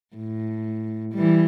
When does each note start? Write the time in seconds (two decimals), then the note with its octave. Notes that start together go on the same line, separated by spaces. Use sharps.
0.16 A2
1.15 E3 G3